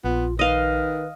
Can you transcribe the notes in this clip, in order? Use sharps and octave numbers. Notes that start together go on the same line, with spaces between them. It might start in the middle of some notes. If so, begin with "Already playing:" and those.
A#1 B3 F4
D#3 B4 D#5 F5